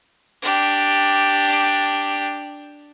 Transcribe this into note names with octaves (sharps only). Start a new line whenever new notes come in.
D4 G4